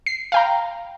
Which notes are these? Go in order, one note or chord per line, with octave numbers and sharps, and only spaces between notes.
C7
F5 G5 A#5